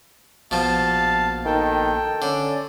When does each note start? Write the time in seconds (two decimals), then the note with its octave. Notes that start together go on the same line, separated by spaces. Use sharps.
0.51 A#1 B2 F3 F5 A5
1.45 D#3 A4 G5
2.22 D3 C#4 D5